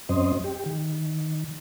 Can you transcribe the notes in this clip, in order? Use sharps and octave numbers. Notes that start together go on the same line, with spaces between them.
F#2 F#3 C4 C#4 C5 D#5
G4
D#3